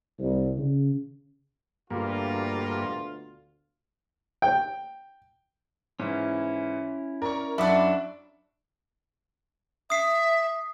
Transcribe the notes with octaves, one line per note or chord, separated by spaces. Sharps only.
C2
C#3
D2 G2 B2 A#3 F4
G5
G#2 E3 C#4 E4
A#4 D5 C#6
F#2 F#3 D4 E5 F#5 B5 C#6 D6
E5 D#6 C7